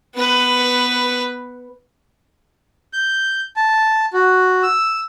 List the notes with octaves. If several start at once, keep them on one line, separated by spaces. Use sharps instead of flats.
B3 B4
G6
A5
F#4
E6